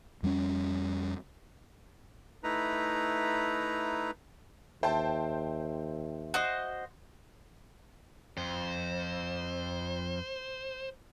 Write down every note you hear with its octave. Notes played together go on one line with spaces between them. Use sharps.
F2 G3 A3 C#4
A3 D#4 E4 B4 A#5
D#2 C5 E5 G5 A5
F#4 C5 D#5
F2 C5